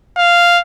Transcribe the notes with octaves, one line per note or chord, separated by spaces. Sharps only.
F5